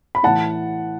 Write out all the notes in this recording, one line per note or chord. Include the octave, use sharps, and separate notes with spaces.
B5
A2 E3 F#5 A5